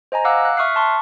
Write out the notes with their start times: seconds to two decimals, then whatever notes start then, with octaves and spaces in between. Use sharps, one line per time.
0.12 C5 D#5 G#5 A#5
0.24 F5 F#5 D6 E6 F#6
0.45 F#6
0.57 E5 C#6 D#6 F6 F#6 C7
0.76 A5 C6 C#6